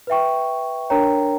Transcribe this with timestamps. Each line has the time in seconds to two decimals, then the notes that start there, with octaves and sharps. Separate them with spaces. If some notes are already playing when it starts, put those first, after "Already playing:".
0.07 B4 E5 G5 C#6
0.90 D4 A#4 C#5 G5 A#5